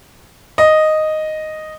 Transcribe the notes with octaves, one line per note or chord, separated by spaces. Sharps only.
D#5